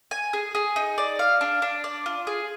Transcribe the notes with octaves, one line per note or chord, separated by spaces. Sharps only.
G#5
G#4
G#4
D#4
D5
F5
D4
D4
D5
F4
G#4